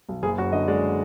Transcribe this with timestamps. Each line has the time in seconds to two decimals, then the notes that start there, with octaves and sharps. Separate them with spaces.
0.09 B1
0.22 F#1 G#4
0.38 F#2 F#4
0.52 D3 D#5
0.68 G#3 D5